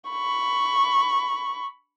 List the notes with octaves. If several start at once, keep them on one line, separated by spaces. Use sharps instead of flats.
B5 C#6